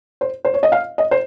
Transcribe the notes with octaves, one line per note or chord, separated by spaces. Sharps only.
C5
C5
C#5
D#5
F5
D#5
C5